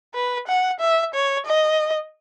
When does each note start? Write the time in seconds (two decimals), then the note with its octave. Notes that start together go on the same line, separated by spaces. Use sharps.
0.15 B4
0.48 F#5
0.80 E5
1.14 C#5
1.46 D#5